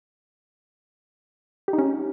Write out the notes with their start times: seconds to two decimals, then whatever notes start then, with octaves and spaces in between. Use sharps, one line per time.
1.68 G4
1.73 D#4
1.78 C#4